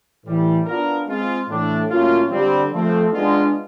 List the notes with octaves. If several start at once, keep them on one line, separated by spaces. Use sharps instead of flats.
A2 E3 G3
B3 D4 F4 A#4
G#3 C4 F4
A2 E3 A3 D4
A2 F#3 A#3 C#4 F4
D3 G3 C4
F3 A3 C4
G#3 B3 D4 F4